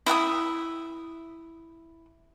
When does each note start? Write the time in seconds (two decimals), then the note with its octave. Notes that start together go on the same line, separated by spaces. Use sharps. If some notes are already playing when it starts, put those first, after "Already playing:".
0.06 E4 E5 F#5 D#6